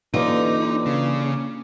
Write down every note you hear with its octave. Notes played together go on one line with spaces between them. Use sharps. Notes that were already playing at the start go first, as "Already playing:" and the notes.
D3 E3 A#3 C#4 D#4 F4 G4 D6
C#3